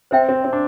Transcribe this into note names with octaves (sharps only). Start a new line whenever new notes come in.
C4 C5 E5 G5
C4
C4
D4